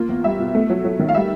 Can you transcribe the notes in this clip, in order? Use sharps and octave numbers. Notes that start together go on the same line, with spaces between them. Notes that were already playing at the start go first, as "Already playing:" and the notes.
Already playing: A#3 F4
E2
G3 E5
B2
A3
F#3
F#3
D#3
F5
G3 E5